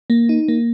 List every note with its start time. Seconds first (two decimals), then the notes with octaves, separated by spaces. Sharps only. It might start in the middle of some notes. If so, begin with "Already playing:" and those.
0.10 A#3
0.29 D#4
0.48 A#3